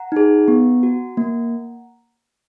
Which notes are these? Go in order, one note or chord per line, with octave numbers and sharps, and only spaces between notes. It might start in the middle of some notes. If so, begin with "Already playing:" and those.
Already playing: F#5 A#5
D#4 G#4
B3
F#4
A#3